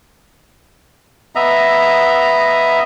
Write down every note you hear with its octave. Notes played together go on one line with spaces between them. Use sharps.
B3 D#5 E5 A#5